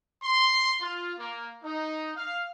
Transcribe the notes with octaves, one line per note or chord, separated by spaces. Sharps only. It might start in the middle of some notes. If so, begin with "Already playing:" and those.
C6
F4
A#3
D#4
F5